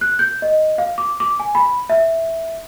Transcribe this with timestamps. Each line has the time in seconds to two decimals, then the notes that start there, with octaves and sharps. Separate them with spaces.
0.01 F#6
0.19 G6
0.42 D#5
0.78 F5
0.98 D6
1.20 D6
1.40 G#5
1.55 B5
1.90 E5